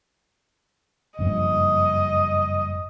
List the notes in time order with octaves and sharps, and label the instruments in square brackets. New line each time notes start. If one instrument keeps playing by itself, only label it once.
[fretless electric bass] F#1 G2 F3 [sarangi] D#5